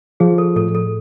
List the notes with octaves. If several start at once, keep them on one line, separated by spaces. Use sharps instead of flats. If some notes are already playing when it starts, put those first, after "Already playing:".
F3 G#4
A4
A2 A4
A4